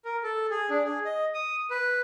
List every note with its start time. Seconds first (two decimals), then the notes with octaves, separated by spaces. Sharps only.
0.05 A#4
0.23 A4
0.51 G#4
0.70 D4
0.84 G#4
1.05 D#5
1.34 D#6
1.70 B4